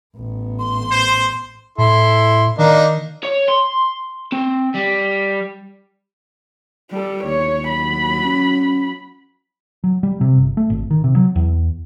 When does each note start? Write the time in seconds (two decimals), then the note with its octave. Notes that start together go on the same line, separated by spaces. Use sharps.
0.16 A1 B3
0.59 C6
0.90 C5
1.78 A2 E4 A4 C6
2.58 D#3 A#3 D4 D#4
3.23 C#5
3.49 C6
4.32 C4
4.74 G3
6.91 G3 A4
7.24 D#2 C#5
7.67 F#3 B5
8.25 C#4
9.84 F#3
10.03 G3
10.21 C3
10.38 G1
10.57 A3
10.70 G#1
10.91 D#3
11.04 C3
11.16 F#3
11.36 E2